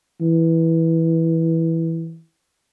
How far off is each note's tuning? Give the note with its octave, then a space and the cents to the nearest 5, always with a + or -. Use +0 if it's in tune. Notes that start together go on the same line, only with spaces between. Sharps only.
E3 -10